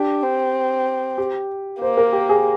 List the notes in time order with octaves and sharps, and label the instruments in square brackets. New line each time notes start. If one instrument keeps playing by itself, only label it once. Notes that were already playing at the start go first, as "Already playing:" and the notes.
Already playing: [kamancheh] D4 [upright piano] G4
[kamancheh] C4
[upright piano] G4
[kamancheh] A#3 [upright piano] C5
[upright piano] A#4
G4
G#4